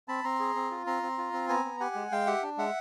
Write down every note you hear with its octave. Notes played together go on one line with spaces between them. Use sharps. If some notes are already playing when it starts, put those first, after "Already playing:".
C4 A5 B5
C4 A#5 C6
G#4
C4
F4
C4 A#5 C6
C4
F4
C4
B3 G#5 A#5
B3
G4 F#5 G#5
G#3
G#3 F5 G5
G4 E5 F#5
D4
G#3 E5 F#5